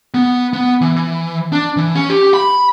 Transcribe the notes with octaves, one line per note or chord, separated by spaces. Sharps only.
B3
B3
E3
E3
D4
E3
C#4
G4
B5